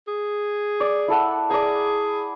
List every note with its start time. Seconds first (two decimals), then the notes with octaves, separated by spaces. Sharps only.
0.08 G#4
0.80 D5
1.08 E4 A4 F#5
1.50 G#4 D5 A#5